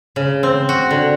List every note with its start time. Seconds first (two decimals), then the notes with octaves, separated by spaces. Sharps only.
0.16 C#3
0.43 C4
0.69 F#4
0.90 D3